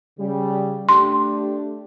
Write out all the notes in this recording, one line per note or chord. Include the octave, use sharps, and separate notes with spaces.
C#3 G3
A3 D4 G4 C6